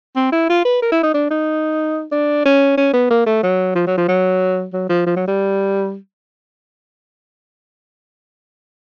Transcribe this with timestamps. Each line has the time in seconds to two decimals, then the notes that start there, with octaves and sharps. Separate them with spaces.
0.16 C4
0.32 E4
0.50 F4
0.65 B4
0.82 A#4
0.92 E4
1.03 D#4
1.14 D4
1.30 D#4
2.12 D4
2.45 C#4
2.77 C#4
2.93 B3
3.10 A#3
3.26 A3
3.43 F#3
3.75 F3
3.87 F#3
3.98 F3
4.08 F#3
4.73 F#3
4.89 F3
5.07 F3
5.16 F#3
5.28 G3